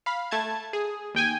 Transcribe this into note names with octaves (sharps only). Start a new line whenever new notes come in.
F5 B5
A3 A5 G#6
G#4
D#2 G5 G#5